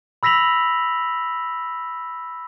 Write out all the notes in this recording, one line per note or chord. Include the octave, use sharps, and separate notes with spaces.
B5 E6 A#6 B6 F7 F#7